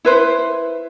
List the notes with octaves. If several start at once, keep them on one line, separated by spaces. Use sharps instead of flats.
E4 B4 C5